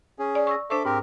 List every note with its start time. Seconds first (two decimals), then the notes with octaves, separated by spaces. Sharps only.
0.19 C#4 G#4
0.35 D5
0.47 C#6 E6 A#6
0.70 D4 A4 C5 E5 C#6 D6
0.85 G#2 C4 G4 A#4